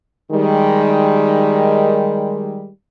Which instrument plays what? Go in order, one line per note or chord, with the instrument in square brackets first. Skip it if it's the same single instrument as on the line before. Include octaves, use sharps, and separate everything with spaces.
[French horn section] D#3 G3 G#3